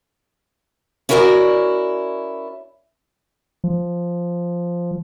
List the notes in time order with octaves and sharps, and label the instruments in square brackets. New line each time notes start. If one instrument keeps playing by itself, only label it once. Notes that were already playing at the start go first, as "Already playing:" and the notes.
[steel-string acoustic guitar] C#4 E4 F#4 A#4 B4 D5
[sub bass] F3